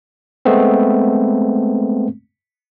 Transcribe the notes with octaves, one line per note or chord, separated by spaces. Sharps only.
G#3 A3 B3 C4